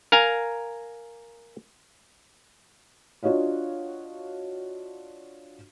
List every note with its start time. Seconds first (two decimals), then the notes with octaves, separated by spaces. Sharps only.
0.12 A#4 F5 G#5 A#5
3.23 D4 F4 F#4 C#5 D#5 F5